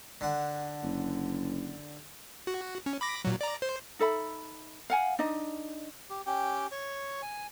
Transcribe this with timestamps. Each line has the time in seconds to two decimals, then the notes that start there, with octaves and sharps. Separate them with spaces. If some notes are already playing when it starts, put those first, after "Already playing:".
0.21 D3 F#5
0.83 F#1
2.47 F#4
2.86 C#4
3.01 B5 D6 A#6
3.25 A#2 F#3
3.41 D5 A#5
3.62 C5
3.99 D#4 A4 E5 B5
4.90 F5 F#5 G#5
5.19 D4 D#4 D#5
6.10 G4
6.26 C#4 G4 G5
6.72 C#5 C#6
7.22 G#5